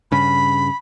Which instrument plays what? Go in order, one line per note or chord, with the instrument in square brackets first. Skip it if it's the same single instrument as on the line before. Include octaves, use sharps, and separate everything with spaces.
[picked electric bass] G2 C#3 [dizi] B5